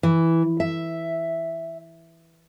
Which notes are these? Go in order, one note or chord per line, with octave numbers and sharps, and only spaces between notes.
E3
E5